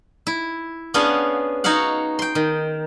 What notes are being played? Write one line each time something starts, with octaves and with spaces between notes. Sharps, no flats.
E4
B3 C#4 D4 G#4 F5 F#5
D#4 F#4 C#5 F5 F#5
G5 C6
D#3